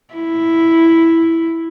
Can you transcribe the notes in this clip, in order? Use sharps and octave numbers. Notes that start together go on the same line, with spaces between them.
E4